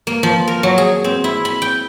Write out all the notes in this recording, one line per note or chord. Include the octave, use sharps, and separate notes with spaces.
A#3
F3
A#4
F#3
G#4
C4
E4
B5
G5